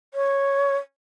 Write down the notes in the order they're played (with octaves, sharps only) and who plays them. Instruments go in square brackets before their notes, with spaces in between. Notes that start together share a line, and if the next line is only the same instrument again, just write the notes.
[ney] C#5